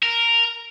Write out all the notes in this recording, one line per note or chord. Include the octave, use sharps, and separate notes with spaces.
A#4